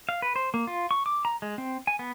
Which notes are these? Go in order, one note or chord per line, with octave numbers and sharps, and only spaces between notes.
F5
B4
C5
A#3
F4
C#6
D6
A#5
G#3
C4
G#5
B3